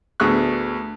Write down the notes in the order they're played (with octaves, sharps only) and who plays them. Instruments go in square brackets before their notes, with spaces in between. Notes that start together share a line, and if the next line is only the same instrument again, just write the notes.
[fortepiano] D2 B3 G#4 E5 C#6 F#6